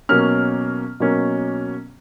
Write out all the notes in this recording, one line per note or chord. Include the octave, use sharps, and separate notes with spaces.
B2 F#3 A#3 C#4 F6
B2 F#3 A#3 C#4